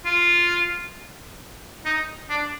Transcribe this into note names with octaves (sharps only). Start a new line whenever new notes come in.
F4
D#4
D4